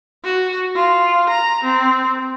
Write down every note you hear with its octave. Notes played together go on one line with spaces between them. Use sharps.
F#4
F4
A#5
C4